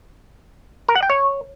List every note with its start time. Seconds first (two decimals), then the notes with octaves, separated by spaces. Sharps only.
0.88 A#4
0.96 F#5
1.03 G5
1.10 C#5